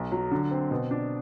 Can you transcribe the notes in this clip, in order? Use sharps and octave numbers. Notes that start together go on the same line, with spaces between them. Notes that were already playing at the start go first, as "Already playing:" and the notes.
Already playing: B1
F#3
D3
C4
B2
D4